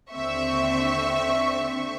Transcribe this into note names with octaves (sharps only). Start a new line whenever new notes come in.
D#2 D3 C4 E5 C#6